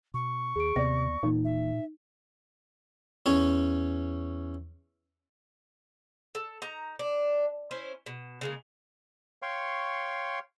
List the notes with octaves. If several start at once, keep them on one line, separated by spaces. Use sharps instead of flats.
B2 C#6
D#2 G#4 D7
D#2 C3 B3 D5 A#6
D#1 A#2 E3 A#3 D#4
E5
E2 C#4 C#5
A4
D#4 A#5
D4
C#4 E4 C5
B2
C#3 G#3 A#3
C#5 F5 G5 C6 C#6